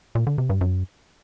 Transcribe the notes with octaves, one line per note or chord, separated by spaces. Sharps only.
A#2
D3
C3
G2
F#2